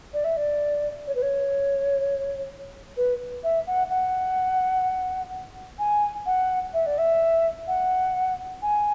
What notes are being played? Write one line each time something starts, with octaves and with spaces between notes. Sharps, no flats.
D5
E5
D5
C#5
B4
C#5
B4
E5
F#5
F#5
G#5
F#5
E5
D5
E5
F#5
G#5